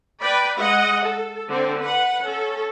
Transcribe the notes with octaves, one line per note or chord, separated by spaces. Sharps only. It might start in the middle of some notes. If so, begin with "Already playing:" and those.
B4 D5 G5 B5
G#3 D#5 F#5
A4
D3 C4
B4 F#5
C#4 A4